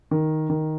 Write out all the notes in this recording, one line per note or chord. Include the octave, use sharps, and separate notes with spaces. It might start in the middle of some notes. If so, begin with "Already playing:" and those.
D#3
D#3